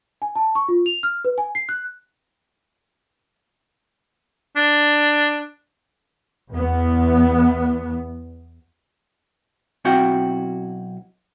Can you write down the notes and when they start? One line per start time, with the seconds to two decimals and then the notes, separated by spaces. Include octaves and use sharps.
0.22 G#5
0.36 A5
0.55 C#6
0.68 F4
0.86 F7
1.03 F6
1.25 B4
1.38 G#5
1.55 C7
1.69 F#6
4.56 D4
6.51 E2 B3
9.85 B1 C4 E4 F#4 F5 G5